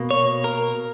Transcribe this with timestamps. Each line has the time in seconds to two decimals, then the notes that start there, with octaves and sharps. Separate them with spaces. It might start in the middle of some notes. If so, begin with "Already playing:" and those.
Already playing: B2 A#3
0.11 C#5
0.44 A#4